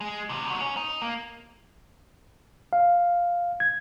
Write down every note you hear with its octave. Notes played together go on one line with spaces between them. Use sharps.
G#3
E2 C3
D#4 F#4
C#4
D#4
A#3
F5
G#6